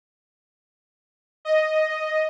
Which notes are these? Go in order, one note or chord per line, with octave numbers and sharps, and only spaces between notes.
D#5